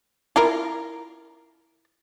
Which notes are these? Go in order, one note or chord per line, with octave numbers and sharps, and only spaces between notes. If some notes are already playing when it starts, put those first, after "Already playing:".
E4 F4 A#4